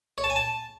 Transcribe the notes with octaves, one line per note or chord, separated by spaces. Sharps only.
C#5
A5
G#5
A5